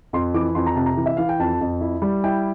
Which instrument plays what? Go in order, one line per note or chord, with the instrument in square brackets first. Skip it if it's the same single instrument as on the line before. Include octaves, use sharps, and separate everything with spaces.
[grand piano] F2 C6
E3 D6
F2 C6
A#5
C3 A5
A#5
E3
E5
E3 F5
G5
F2 A5
F2
E4
G3
E4 G5